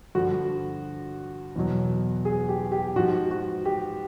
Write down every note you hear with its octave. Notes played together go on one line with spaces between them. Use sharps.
G2 D3 F3 F#4
E2 B2 F#3
G#4
G4
G4
G#2 F3 F#4
F#4
G4